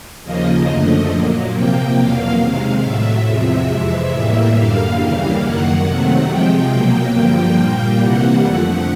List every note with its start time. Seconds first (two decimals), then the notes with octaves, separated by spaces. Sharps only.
0.24 D#2 C#3 F3 A#3 D#5
0.68 F#2 D3 F3 A3
1.11 A#2 F#3 A#3
1.54 C3 F3 A#3 G5
1.97 E2 B2 F#3 A#3 F5
2.40 C3 D#3 G#3
2.83 A2 F#3 A3 E5
3.27 E2 C3 F3 G#3
3.69 F2 C3 E3 G#3 E5
4.12 A2 E3 G3 A#3
4.55 F#2 D3 G3 A#3 F5
4.98 D#2 C#3 E3 G3 A#3
5.41 F#2 D#3 F#3 A#3 F#5
5.85 C3 D#3 F#3 A3
6.27 C3 F3 G#3 G5
6.70 B2 F#3 A#3
7.14 G2 D3 F3 A#3 G5
7.57 A#2 G3 A#3
8.00 C3 E3 G3 A#3 F#5
8.43 F2 D3 F3 A3